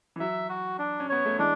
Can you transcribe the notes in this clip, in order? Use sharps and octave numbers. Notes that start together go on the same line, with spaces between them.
E3
F#3 E5
F#4
D4
C#4
B3 C#5
A3
E3 G#3 D4